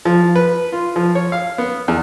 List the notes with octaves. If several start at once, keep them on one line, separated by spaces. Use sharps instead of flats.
F3
B4
F4
F3
C#5
F5
B3
E2